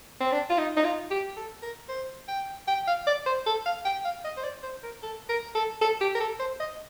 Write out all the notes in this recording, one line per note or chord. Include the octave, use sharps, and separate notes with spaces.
C4
D4
F4
D#4
D#4
F4
G4
A4
A#4
C5
G5
G5
F5
D5
C5
A4
F5
G5
F5
D#5
C5
D5
C5
A#4
A4
A#4
A4
A4
G4
A#4
A4
C5
D#5